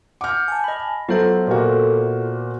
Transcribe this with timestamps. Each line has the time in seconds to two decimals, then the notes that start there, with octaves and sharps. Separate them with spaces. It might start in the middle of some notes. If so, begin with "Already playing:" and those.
0.21 F#5 D6 F6 G6
0.48 G#5 A5
0.64 D#5 B5
1.09 F#3 B3 F4 A4 C5 E5
1.47 A#2 A#3 F#4